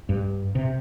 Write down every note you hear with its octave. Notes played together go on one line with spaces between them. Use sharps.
G2
C3